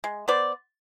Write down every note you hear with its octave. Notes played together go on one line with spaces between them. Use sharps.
G#3
B3 C5 D5